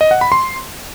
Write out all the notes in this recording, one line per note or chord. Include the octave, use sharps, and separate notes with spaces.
D#5
F#5
B5
C6